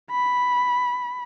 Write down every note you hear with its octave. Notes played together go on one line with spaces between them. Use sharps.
B5